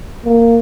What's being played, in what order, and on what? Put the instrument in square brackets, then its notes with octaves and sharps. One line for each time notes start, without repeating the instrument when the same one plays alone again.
[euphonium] A#3